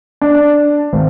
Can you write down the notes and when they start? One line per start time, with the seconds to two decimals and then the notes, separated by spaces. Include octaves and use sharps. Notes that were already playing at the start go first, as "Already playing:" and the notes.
0.22 D4
0.93 G#1